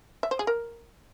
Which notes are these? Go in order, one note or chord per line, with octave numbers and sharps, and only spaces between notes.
E5
C5
G#4
A#4